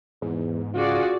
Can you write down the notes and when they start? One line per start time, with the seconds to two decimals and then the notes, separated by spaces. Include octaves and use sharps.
0.22 E2 G#2
0.74 C#3 F4 F#4 G#4 D5